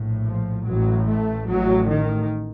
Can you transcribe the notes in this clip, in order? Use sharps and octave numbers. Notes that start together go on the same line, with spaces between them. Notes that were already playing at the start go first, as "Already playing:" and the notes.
Already playing: A#1 A2
F3
A1 A2 F#3
A3
A1 A2 F#3
D#3